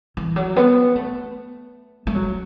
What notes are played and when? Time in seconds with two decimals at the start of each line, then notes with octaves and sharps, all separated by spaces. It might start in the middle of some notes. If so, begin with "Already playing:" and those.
0.17 E3
0.36 F#3
0.56 B3
0.95 A3
2.07 A3
2.15 F#3